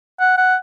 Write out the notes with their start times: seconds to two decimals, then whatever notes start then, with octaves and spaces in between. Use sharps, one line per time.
0.20 F#5
0.37 F#5